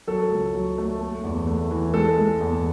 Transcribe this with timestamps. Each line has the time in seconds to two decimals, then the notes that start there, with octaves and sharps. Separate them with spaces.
0.07 F#3 A4
0.30 C#2
0.54 F#3
0.78 A3
1.01 A3
1.24 E2
1.47 A3
1.71 E3
1.94 G#3 A4
2.18 G#3
2.40 E2